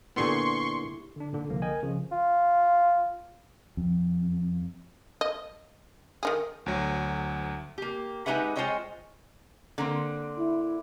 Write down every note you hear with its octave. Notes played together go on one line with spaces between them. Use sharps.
A#2 D3 B3 E4 G4 G#4 C6 C#6
D3 D4
A#2 D3 D4
C2 D3 F3 A#3
A#4 D#5 G5 G#5
C#3 F3
F4
F2
D#5
D#3 D#4 G#4
D2 F#3
A#3 G4
G#3 D#4 G4 B4 E5 F#5
G#3 F4 C5 C#5 D#5 G5
D3 A#3 C4
E4